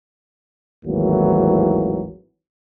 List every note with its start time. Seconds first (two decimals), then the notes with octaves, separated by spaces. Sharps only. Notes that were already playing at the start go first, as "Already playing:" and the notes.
0.85 G#1 D#2 A2 E3 F#3 A#3